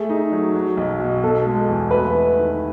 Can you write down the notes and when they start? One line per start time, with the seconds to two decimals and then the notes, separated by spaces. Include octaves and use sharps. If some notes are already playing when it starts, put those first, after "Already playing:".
Already playing: A3 G#4
0.09 D#4
0.32 F#3
0.55 F#3
0.77 B1
1.00 B2
1.23 B2 A4
1.46 G#3
1.68 E2
1.91 A3 B4
2.13 E4
2.37 D#3